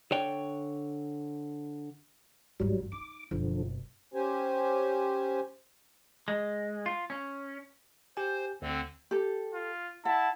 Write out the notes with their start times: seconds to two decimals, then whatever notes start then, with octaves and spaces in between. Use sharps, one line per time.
0.11 D3 C#5 G5
2.60 G1 E2 G#2 F#3 G3
2.92 D#4 D6
3.31 F#1 B2 D3 F3
4.14 C#4 G4 C5 G#5
6.28 G#3
6.86 F4
7.10 C#4
8.17 G4 C5 G#5
8.62 D2 D3 C4
9.11 G4 A4
9.54 F4
10.05 E4 F#5 A5